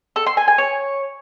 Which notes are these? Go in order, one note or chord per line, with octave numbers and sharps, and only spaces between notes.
A4
C6
G#5
G#5
C#5